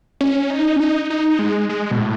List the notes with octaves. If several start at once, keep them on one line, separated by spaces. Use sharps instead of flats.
C#4
D#4
C#4
D#4
D#4
G#3
G#3
B2
A2